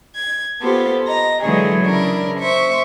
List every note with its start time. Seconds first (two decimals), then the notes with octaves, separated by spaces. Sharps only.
0.14 G#6
0.60 B3 F4 G4 A4 C5
1.05 D#5 A#5
1.42 D3 E3 F#3 G#3 G#4 C#5
1.84 C#3 D4 E4 A#4
2.40 C5 E5 C#6